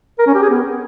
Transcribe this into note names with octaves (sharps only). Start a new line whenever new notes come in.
A#4
C#4
G4
G#4
B3